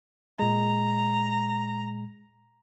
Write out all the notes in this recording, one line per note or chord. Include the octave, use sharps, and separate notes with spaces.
A#2 G#3 A#5